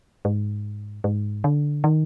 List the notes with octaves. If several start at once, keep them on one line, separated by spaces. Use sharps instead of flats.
G#2
G#2
D3
D#3